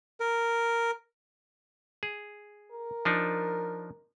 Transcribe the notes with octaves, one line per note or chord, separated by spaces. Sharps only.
A#4
G#4
A#4
F3 D4 D#4